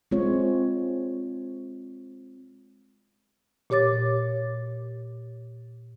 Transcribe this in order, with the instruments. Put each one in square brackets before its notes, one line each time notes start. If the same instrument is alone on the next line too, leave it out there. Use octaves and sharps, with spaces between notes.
[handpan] G#3 C4 F4 C#5
[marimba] A#2 G4 C#5 D6 A6